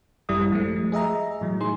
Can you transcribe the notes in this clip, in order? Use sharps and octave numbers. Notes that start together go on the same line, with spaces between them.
A1 F#2 G3 E4 D5 D#6
F3 G#3 A3
G#4 D#5 E5 A#5
A2 E3 F#3
D#4 G#4 C6